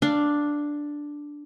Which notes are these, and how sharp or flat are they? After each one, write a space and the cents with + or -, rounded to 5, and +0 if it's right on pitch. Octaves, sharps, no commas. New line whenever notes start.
D4 +0 F5 -15